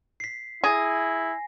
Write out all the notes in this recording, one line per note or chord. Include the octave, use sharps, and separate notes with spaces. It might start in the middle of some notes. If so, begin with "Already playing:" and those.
B6 C7
E4 G#4 G#5 A#6